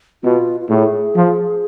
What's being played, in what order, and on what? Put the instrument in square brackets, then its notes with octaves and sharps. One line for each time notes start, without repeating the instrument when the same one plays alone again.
[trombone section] B2 [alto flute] F4
[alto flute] F4
[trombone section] A2 [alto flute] G#4
[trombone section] F3